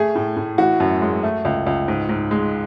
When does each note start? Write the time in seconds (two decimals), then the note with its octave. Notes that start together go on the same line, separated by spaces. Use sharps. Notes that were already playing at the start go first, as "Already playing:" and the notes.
Already playing: A3 G#4
0.15 A2
0.37 A2
0.58 E3 F#4
0.80 F#2
1.02 G#3
1.23 A3
1.45 C#2
1.66 C#2
1.88 G#2
2.09 G#2
2.31 G#3